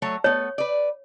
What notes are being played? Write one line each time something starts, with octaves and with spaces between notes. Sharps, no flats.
F#3 A3 C#5
A3 B3 C#5
B4 D5